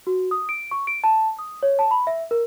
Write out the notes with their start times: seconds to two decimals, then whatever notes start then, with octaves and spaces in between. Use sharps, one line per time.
0.07 F#4
0.31 D#6
0.49 D7
0.71 C#6
0.87 D7
1.04 A5
1.39 D#6
1.63 C#5
1.79 A5
1.91 B5
2.07 E5
2.31 A#4